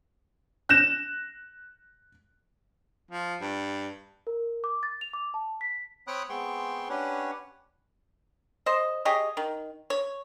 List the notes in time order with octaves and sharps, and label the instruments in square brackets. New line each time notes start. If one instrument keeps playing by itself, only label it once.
[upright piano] F#6 G6 A#6 E7
[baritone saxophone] F3
G2
[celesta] A#4
D6
A6
F7
D6
A5
B6
[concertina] C4 C#5 G5 B5 D#6 F#6
G#3 B3 C4 G5 C6 C#6
C#4 D4 G4 B4 C#5 F#5
[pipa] C5 D#5
G4 G#4 C#5 D#5
D#3
C#5